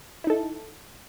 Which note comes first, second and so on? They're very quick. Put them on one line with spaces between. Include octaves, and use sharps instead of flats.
E4 D#4 A4